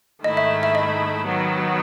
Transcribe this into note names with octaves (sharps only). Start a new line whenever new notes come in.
G#2 D#3 A3 E4 D#5
E5
E5
D#5
D#3 F#3 B3